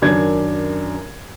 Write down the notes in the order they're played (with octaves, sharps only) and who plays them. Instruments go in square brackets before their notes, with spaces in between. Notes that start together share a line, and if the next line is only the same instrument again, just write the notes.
[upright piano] F#2 D#3 D4 G#6